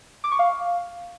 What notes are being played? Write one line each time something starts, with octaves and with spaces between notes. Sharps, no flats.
D6
C#6
F5